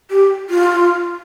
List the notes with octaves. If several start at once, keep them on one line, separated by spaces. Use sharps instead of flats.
G4
F4